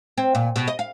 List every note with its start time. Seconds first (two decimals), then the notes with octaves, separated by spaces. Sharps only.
0.18 C4
0.35 A#2
0.56 B2
0.68 D#5
0.79 F5